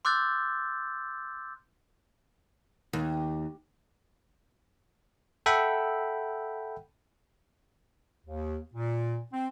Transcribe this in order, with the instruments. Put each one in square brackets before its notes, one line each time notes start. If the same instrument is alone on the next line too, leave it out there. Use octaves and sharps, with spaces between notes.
[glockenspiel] C6 D6 E6 F#6 G6 A6
[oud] D#2
[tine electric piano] A4 E5 F#5 G5 B5
[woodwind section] D#2
A#2
C4